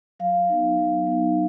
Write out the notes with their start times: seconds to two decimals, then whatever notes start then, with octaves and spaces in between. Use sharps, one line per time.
0.20 F#3 F5
0.49 B3 D#4
0.78 F#3
1.07 B3 D#4